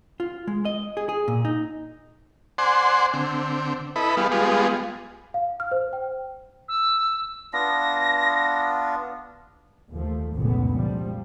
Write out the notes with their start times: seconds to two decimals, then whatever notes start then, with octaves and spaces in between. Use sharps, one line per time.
0.20 F4
0.47 G#3
0.65 D#5
0.97 G#4
1.09 G#4
1.28 A#2
1.45 D#4
2.58 C5 D5 F#5 G#5 C6
3.14 D3 C4
3.96 E4 A4 B4 D#5 B5
4.17 G3 B3 G#4 F5
4.32 G3 G#3 B3 F4 G#4
5.34 F5
5.60 F6
5.71 C5
5.93 G5
6.68 E6
7.53 B3 D4 F4 A#6
9.92 D#2 F3 A3
10.36 F1 C#2 A#2 D3 B3
10.75 F3 G3